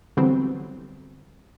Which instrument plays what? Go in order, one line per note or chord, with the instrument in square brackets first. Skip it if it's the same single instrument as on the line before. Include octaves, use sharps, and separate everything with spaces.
[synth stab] D3 E3 F#3 G3 B3 C4